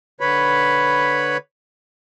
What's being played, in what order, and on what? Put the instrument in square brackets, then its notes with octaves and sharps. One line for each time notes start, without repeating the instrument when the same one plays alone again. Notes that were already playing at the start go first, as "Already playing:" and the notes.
[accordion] D3 B4 C#5 B5